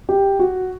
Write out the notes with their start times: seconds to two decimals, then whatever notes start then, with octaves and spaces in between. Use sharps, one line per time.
0.09 G4
0.39 F#4